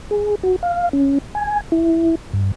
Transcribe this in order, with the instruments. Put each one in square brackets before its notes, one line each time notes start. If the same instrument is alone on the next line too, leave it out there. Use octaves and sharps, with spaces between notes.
[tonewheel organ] G#4
F#4
F5
C#4
G#5
E4
G2